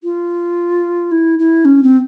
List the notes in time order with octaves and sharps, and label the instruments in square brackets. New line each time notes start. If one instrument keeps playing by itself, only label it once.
[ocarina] F4
E4
E4
C#4
C4